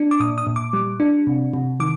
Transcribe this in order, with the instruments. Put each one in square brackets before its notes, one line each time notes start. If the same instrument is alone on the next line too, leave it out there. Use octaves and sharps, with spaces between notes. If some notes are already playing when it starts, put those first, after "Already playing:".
Already playing: [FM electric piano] D4
D6
A#2 D#6
D#6
A#2
D6
G3
D4
C3
C3
D#3 D6